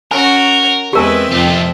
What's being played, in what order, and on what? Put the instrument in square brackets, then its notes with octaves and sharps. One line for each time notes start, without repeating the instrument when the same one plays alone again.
[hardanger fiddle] C#4 F#4 [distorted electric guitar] A#4 [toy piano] G#5
[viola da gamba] E2 G#3 B4 [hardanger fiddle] C4 E5 [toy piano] G4 A#4 G#5
[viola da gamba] F2 C3 F3 [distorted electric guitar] A3 F4